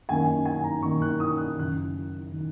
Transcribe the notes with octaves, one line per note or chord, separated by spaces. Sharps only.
F#2 D#3 A#3 D#4 G#5
G#5
A#5
F#2 D#3 A#3 D#4 C#6
F#6
D#6
F#6
F#1 F#2 D#3 F#6
D#3